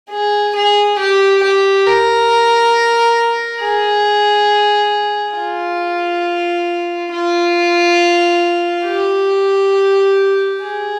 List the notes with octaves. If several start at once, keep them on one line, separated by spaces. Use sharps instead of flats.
G#4
G#4
G4
G4
A#4
G#4
F4
F4
G4
G#4